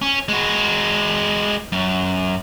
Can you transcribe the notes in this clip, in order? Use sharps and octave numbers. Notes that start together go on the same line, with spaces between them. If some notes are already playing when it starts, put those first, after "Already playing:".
C#4
G#3 F#4
F#2